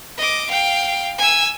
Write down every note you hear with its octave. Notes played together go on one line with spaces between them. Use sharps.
D#5 D6
F5 G5
G#5 E6